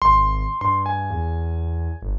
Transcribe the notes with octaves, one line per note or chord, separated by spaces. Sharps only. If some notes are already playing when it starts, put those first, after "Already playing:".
G#1 C6
G2 C6
G#5
E2
G1